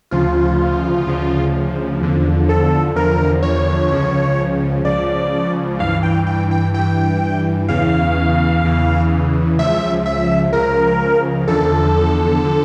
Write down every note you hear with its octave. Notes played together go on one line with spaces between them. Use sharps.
D2 C#3 F3 F4
D2 C#3 F3
E2 D3 F3
A4
E2 D3 F3 A#4
C#5
C#2 C#3 F3
C#2 C#3 F3 D5
G2 E3 F5
G5
G5
G5
G2 E3 G5
E2 C#3 E3 F5
E2 C#3 E3
C#2 C#3 F3 E5
E5
C#2 C#3 F3 A#4
E2 D3 F3 A4
D3 F3